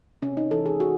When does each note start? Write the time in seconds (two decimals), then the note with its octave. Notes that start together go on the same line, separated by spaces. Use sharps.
0.22 C3 C#4
0.37 D#4
0.51 E3 A4
0.66 G#4
0.80 E3 F#4